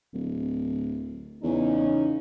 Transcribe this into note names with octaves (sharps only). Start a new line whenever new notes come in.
D1
E2 C#3 C#4 D#4